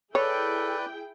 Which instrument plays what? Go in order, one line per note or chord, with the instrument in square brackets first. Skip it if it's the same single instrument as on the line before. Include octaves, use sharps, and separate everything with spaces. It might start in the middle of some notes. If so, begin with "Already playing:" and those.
[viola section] E4 G#4 G5 [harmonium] A4 [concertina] B4 D5 [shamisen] C#5